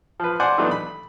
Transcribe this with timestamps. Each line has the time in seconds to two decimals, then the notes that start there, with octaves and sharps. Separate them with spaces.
0.20 F3 B4
0.40 C5 D5 F#5 G#5
0.58 D#3 E3 F#3 A3 B3 D4
0.71 B5